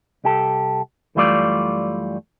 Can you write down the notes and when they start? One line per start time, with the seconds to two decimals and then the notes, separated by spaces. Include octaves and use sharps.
0.24 C2 G4 A4
1.15 F#2 E3 G3 A3 F4 D5